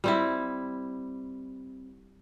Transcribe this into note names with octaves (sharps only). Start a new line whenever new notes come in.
G3 C4 E4